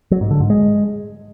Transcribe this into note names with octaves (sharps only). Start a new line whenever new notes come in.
F#3
G#2
D3
G#2
G#3